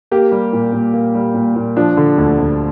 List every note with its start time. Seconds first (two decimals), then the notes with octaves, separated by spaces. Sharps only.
0.11 A#3 G4
0.32 G3
0.53 A#2
0.73 A#2
0.94 A#3
1.15 G3
1.35 A#2
1.56 A#2
1.77 F3 D4
1.97 D3
2.18 D2
2.38 D2